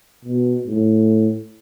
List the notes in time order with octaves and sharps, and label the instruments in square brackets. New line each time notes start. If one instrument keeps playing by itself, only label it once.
[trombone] B2
A2